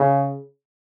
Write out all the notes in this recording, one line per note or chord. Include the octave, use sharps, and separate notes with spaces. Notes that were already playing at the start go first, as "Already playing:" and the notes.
Already playing: C#3